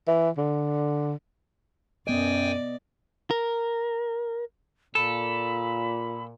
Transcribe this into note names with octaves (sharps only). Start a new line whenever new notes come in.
E3
D3
F#2 B3 D5 D#5 G5 G#5
A#4
A#2 A4 B5